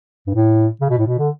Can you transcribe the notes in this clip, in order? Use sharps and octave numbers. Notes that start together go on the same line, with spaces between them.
G2
A2
C#3
B2
A2
B2
D3